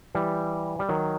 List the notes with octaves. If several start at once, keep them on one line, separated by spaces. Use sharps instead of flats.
E3 G3
G3
D#3 F#3